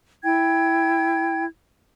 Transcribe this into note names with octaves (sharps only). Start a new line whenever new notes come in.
E4 G5 G#6